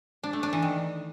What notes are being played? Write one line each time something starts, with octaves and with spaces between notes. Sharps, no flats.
D4
A3
D4
E3
D#3